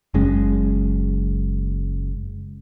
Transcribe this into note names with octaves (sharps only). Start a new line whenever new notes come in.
F#1 F#2 G#3 C#4